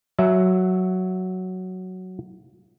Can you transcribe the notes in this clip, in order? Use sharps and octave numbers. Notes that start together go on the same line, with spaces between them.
F#3 E5 F#5